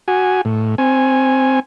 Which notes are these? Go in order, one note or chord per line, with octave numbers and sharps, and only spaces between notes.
F#4 G#5
A2
C4 G#5